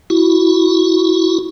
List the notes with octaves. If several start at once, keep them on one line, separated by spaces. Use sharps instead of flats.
E4 F#4